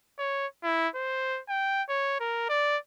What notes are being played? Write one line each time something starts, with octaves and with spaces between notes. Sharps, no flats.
C#5
E4
C5
G5
C#5
A#4
D5